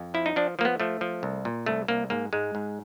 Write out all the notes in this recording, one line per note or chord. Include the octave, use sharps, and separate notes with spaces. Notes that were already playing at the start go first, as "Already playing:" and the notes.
Already playing: F2
F3 E4
D#4
F3 D4
F3 A#3
B3
F3 A3
F3
C2
A#2
C2 A3
C2 A#3
G#2 A#3
G#2 G#3
G#2